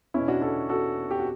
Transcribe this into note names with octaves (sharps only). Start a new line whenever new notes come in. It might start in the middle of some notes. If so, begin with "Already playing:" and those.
E2 B2 C#4 E4
D4 F#4
F#4 A4
F#4 A4
G4
F#4